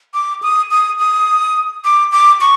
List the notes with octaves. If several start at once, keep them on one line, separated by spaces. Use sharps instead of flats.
D6
D#6
D#6
D#6
D6
D6
C#6